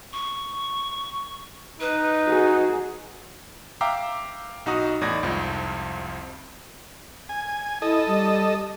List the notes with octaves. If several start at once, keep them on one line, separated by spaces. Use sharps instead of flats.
C#6
D#4 B4
F#4 G#4
E5 F5 G5 A#5 D6 E6
B1 D#4 F#4 D#6
E2 A2 D#4 D5 G#6 A#6
C2 F2 G#2 F3
G#5
E4 A4 D#5
G3